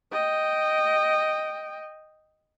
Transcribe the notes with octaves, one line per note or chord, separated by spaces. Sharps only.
D#5 G5